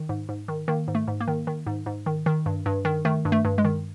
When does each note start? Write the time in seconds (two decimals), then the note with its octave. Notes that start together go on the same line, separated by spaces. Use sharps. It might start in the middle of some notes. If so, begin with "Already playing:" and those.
Already playing: D#3
0.09 G#2
0.29 G#2
0.48 D#3
0.68 D#3 A#3
0.88 G#2
0.95 A3
1.08 G#2
1.21 A#3
1.28 D#3
1.47 D#3
1.67 G#2
1.86 G#2
2.06 D#3
2.26 D#3
2.46 G2
2.66 G2
2.85 D#3
3.05 D#3 A3
3.25 G2
3.32 A3
3.45 G2
3.58 G#3
3.65 D#3